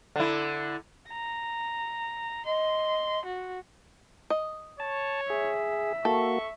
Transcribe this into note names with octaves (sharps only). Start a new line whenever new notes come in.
D3 E4
A#5
D#5 C6
F#4
D#5
C#5 A5
G#4 E5
A#3 F#4 A4 C#6